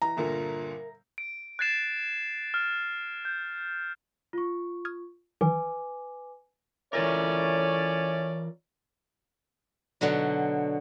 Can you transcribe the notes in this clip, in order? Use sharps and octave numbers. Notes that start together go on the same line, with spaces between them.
E3 A#5
G1 A#2 D3 A#4 E5
D7
F#6 G#6 A6 C7 E7
F6
G6
F4 C#6
D#6 F6 G#6
D#3 E3 F#3 B4 G#5 D6
E3 A3 C#4 F4 A#4 C#5 D5
B2 D3 F#3